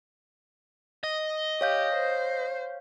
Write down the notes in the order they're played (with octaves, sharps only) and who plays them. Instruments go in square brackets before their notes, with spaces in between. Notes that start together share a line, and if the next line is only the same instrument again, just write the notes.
[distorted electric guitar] D#5
[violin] G4 [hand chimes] C#5 F5 G6
[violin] C5